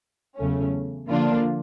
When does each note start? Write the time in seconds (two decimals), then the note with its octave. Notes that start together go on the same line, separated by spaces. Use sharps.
0.37 E2 C#3 F#3 A3 C#4
1.09 D3 F3 A#3 D4 F4